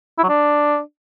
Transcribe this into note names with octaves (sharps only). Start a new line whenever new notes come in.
E4
F#3
D4